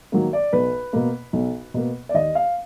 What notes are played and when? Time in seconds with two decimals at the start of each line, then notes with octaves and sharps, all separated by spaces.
0.12 D#3 F#3 A#3
0.33 D5
0.53 B1 B4
0.93 B2 A#3
1.33 B1
1.74 B2 A#3
2.09 D5
2.14 D#2 D#5
2.35 F5